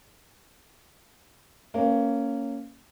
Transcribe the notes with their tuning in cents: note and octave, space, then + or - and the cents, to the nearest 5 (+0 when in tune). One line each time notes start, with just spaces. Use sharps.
A#3 -15 C#4 +0 B4 +15